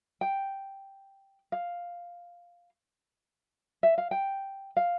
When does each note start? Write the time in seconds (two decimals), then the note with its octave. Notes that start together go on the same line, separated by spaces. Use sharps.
0.21 G5
1.52 F5
3.83 E5
3.98 F5
4.11 G5
4.77 F5